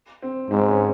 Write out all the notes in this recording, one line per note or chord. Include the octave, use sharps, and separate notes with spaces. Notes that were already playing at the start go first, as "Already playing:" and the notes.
C4
G#2 C4
C#4